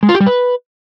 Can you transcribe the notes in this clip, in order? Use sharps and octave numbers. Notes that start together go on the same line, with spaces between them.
G#3
F4
G4
G3
B4